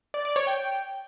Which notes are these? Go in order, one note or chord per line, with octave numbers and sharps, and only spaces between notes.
D5
D5
C#5
G5